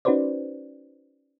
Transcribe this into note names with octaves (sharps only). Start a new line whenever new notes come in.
C#4 D#4 F#4 B4 C5 D5